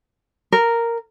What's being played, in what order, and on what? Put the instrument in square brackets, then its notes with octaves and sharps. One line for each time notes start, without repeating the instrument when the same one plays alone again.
[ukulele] A#4